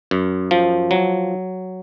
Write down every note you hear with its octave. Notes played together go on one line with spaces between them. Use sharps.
F#2
F3
F#3